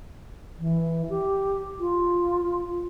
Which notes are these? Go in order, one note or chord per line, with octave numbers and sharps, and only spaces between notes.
E3
G4
F4